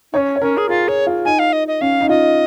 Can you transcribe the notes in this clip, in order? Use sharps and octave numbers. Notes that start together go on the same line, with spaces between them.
C#4 D#4 C#5
C#5
C#4 A#4
G#4
F4 G#4
G#4 C#5
F4
D#4 G#5
F5
D#5
D#5
C#4 F5
D#4
F4 D#5